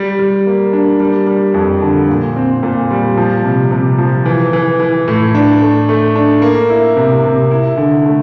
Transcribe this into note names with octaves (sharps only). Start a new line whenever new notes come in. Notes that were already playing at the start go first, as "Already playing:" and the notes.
Already playing: G3
G3
A#3
D4
G3
G3
F2
D3
A#2
C4
A#2
G3
F3
C3
C3
F3
E3
E3
E3
A2
D4
A3
A3
D4
A#3
E4
C3
C3
E4
D3
A3